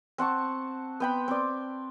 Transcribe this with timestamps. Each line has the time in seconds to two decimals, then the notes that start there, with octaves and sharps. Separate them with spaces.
0.18 C4 F#5 A5 C#6
1.00 B3 G5 B5
1.28 C4 D5